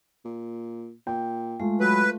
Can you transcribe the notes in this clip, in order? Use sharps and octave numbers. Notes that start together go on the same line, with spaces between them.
A#2
A#2 G5
G#3 A3 F4
F#3 B4